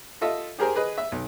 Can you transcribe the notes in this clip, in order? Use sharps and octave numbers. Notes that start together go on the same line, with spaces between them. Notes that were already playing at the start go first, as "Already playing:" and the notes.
F4 A4 D#5 E5
G4 G#4 A#4 C5 G#5
G#4 B4 D#5
E5
B1